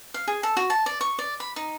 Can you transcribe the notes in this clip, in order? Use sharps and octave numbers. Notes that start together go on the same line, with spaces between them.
F5
G#4
A4
F#4
A5
D5
C#6
D5
B5
D#4